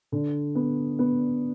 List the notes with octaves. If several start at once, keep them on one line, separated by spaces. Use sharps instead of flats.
D3
B3
B3